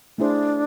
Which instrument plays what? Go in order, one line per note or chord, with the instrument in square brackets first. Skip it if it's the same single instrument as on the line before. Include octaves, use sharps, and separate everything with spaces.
[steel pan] A3 E4 G#4 C5 [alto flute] D4